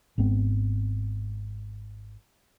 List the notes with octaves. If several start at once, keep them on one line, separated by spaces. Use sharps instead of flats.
G#1 G#2 B3 C4